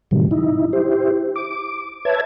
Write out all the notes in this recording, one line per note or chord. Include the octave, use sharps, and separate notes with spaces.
A2 C3 D#3 F#3 G3
D#4 E4
E4 G4 C5
D6
B4 C#5 E5 A5 G#6